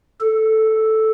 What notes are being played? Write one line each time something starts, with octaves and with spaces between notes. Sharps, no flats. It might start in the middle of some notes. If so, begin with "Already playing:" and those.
A4